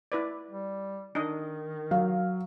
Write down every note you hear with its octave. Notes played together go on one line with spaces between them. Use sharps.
E4 B4 D5
G3
D#3 D4 D#4 D#5
F#3 F5